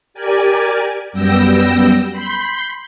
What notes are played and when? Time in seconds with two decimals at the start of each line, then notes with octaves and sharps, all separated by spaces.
0.14 G4 A#4 D5 G#5
1.13 F#2 G3 B3 G5 E6 A#6
2.11 B5 C6 G6